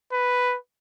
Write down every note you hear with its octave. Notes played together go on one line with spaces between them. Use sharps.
B4